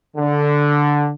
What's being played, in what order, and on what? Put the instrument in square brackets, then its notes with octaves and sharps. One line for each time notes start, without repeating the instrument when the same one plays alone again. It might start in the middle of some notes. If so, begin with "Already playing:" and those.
[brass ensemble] D3